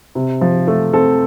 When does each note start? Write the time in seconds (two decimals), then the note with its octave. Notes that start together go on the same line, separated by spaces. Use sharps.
0.15 C3
0.41 F3
0.67 A3
0.93 C4 A4